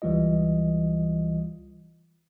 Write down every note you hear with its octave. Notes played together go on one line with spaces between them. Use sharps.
C#2 E3 G3 F4 D#5